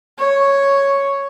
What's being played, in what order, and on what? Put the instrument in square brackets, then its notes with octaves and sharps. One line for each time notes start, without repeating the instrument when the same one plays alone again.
[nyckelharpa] C#5